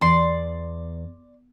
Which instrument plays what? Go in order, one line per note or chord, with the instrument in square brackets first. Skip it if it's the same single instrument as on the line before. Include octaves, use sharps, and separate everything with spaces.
[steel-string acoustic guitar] E2 [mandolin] D5 C6